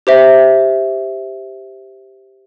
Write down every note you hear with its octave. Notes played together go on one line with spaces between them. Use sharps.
G4 C5 E5